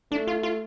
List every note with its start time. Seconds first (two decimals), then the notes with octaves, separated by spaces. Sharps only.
0.11 A3 D4
0.27 F4
0.43 F4